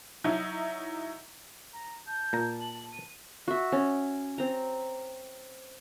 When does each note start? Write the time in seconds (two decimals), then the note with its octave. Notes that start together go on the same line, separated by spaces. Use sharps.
0.24 F#3 D#4 E4
1.73 A#5
2.07 A5 G6
2.33 A#2 A#5
2.61 F#7
2.92 D#7
3.48 F#4 E5
3.72 C#4
4.38 C4 A#5